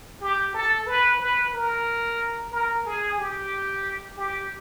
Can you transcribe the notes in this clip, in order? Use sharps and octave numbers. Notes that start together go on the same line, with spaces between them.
G4
A4
B4
B4
A#4
A#4
G#4
G4
G4